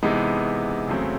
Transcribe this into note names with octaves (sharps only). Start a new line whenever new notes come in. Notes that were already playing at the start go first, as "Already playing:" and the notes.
C3 E3 G#3 B3 D#4
E2 C#3 F#3 A3 C4